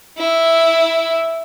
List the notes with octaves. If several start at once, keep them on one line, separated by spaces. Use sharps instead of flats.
E4